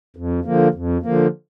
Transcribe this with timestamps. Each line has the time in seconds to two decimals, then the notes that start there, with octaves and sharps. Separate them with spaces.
0.16 F2
0.45 D3 F3 A#3
0.74 F2
1.03 D3 F3 A#3